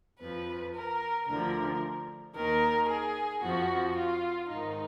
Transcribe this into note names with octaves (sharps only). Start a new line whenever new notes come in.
F2 F3 B4
A#4
D2 D3 F3 A#4
D#2 D#3 A#4
G#4
F2 F3 F#4
F4
G#2 D#3 D#4